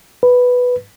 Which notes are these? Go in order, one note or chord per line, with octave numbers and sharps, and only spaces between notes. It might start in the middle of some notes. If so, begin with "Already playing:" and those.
B4